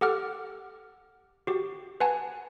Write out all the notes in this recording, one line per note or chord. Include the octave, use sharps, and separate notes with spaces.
G4 A4 F#5 D6 F6
F#4 G4
B4 F#5 G#5 A5